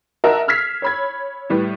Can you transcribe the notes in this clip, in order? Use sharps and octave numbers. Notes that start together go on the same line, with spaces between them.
F#4 A#4 D#5 E5 A5
E6 F6 G#6 B6 C7
C#5 B5 G#6
A2 G3 B4